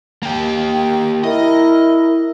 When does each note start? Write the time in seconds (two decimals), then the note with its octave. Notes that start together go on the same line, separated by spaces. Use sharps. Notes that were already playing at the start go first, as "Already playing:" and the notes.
0.23 A#3 G4
0.73 G5
1.24 E4 A#4 D#5